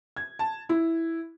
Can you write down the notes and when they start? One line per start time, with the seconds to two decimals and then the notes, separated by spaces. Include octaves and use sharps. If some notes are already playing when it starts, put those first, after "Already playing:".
0.17 G#6
0.39 A5
0.69 E4